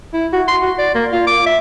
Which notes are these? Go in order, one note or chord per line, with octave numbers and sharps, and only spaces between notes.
E4
F#4
C6
F#4
D5
A#3
F4
D6
E5